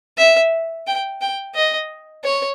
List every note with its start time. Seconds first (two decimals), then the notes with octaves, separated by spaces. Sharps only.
0.18 E5
0.87 G5
1.21 G5
1.55 D#5
2.24 C#5